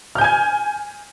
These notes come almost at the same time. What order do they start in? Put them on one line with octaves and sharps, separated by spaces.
F6 G6 G#5 G#6